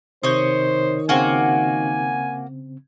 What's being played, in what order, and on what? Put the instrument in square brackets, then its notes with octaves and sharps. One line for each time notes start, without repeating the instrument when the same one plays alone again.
[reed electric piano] C3 G6 [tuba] D#3 [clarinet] C5 [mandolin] C#5 D#5
[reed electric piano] C#3 C4 [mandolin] A#3 F#4 [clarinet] G#5